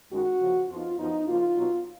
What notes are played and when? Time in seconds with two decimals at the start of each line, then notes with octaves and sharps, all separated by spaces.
0.11 F#2 D#3 G#3 C#4 F#4
0.41 D#2 C#3 F3
0.69 F2 F3 B3 D#4 F4
0.98 F#2 F3 B3 D#4
1.27 C#3 F3 A#3 F4
1.56 B2 F#3 B3 D#4